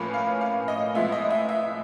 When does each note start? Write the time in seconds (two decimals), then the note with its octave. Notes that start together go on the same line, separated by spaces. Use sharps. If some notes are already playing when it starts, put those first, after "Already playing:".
Already playing: A2 F3 A#3 C#4 B4
0.14 F5
0.41 F5
0.68 D#5
0.94 A2 F3 G#3 B3 E5
1.12 D#5
1.30 E5
1.49 E5